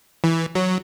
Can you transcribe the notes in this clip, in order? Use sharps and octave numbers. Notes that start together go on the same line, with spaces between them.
E3
F#3